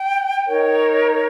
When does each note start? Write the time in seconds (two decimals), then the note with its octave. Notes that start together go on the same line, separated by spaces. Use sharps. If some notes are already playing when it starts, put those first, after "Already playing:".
Already playing: G5
0.45 D#4 A#4 C#5